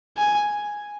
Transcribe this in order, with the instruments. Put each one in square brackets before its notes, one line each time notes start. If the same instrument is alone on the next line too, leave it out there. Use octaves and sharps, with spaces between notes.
[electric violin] G#5